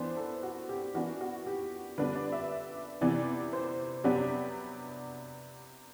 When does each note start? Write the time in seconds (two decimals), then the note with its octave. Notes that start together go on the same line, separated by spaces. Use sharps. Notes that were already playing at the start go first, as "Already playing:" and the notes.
Already playing: E3 B3 D4 C5
0.17 A4
0.43 F#4
0.69 G4
0.94 E3 B3 D4 F#4
1.21 F#4
1.46 G4
1.98 D3 G3 B3 D4 B4
2.15 D5
2.32 E5
3.01 C3 E3 B3 D5
3.53 C5
4.04 C3 F#3 B3 D4 G4